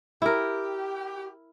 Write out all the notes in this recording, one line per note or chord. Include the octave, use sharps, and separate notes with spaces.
E4 G4 A#4